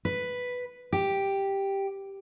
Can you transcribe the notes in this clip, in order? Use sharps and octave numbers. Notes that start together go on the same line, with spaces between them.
B4
G4